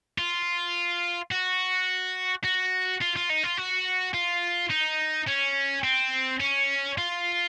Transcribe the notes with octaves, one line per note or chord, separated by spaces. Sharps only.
F4
F#4
F#4
F4
F4
D#4
F4
F#4
F4
D#4
C#4
C4
C#4
F4